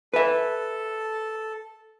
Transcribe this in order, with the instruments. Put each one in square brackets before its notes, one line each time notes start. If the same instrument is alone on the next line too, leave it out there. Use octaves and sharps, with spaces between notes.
[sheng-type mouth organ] A4 [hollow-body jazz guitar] B4 E5